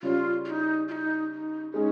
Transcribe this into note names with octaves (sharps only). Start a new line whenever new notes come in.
C#3 G3 C#4 F4
F4
D#4
F4
D#4
D#4
G#3 C#4 D#4 G#4